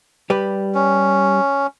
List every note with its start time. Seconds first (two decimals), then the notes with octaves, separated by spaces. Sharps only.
0.30 G3 G4 B4
0.74 C#4